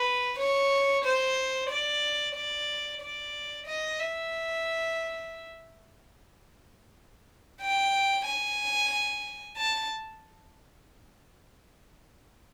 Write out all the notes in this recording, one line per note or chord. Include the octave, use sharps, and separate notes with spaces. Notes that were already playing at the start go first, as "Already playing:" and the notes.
Already playing: B4
C#5
C5
D5
D5
D5
D#5
E5
G5
G#5
A5